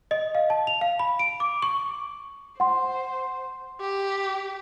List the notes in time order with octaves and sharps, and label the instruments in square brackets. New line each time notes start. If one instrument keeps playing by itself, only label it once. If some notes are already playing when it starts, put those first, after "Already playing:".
[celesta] D#5
F5
A5
F7
F5
B5
D7
D6
C#6
[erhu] C5 [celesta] F#5 C6
[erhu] G4